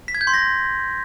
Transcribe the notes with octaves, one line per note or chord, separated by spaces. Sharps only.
B6
G#6
G6
C6
A#6